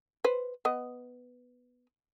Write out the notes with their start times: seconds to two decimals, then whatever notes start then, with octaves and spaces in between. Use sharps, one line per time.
0.24 B4 C5
0.65 B3 D#5